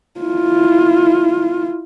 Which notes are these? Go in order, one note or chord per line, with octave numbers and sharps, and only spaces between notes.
E4 F4